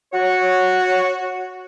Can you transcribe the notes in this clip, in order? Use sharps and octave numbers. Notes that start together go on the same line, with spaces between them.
F#4 C#5